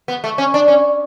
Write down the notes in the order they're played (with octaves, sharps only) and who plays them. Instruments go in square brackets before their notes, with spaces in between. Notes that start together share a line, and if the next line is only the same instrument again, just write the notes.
[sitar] B3
A3
C#4
D4
C#4